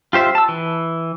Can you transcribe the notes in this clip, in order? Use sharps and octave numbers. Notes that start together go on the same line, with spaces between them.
F4 G4 C5 E5
A5 E6
E3